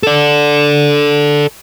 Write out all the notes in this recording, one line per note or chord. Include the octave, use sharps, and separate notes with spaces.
A4 D5